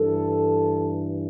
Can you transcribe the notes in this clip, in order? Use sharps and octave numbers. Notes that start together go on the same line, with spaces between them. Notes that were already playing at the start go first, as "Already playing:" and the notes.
Already playing: G2 E3 A4